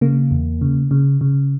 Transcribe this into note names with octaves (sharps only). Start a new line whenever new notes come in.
C#3 A#3
E2
C#3
C#3
C#3